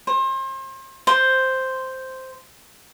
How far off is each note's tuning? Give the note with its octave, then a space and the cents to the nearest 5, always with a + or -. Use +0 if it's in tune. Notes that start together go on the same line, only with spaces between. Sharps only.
C5 +35
C5 +0